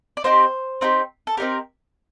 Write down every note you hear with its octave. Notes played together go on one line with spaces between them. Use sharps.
D5
C4 D#4 G4 C5
C4 D#4 G4
A4
C4 D#4 G4 A#4